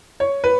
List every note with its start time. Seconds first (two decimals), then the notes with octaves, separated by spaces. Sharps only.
0.20 C#5
0.44 B4